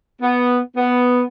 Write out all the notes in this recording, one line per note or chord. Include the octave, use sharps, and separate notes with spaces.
B3
B3